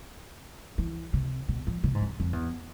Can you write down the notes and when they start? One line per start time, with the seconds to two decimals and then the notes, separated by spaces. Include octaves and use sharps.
0.78 E3
1.13 C3
1.49 B2
1.67 F3
1.84 C3
1.95 G#2
2.02 F2
2.20 F2
2.33 E2